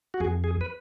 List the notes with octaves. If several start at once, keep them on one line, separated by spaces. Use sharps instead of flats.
F#4
F2 G#4
G#4
B4